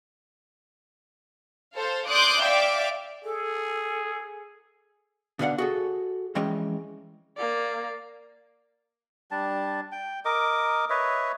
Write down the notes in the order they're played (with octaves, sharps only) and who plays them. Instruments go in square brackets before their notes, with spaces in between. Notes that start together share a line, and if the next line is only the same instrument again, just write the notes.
[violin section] A4 C5 F5
D5 C6 D6 D#6 F#6 G6
D5 E5 F5 G5 D6
[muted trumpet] G#4 [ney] A4
[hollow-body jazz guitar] B2 D3 B3 D4 F5 F#5
F#4 G#4 A4
F2 E3 G#3 C#4 D#5 G5
[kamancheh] A#3 D5
[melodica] G3 D4 A5
G5
A#4 D#5 D6
B4 C#5 D#5 E5